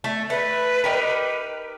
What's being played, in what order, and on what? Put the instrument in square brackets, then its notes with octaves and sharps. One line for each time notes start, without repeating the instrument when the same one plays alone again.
[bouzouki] A3
[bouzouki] A3 [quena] B4
[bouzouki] D#4 G4 A#4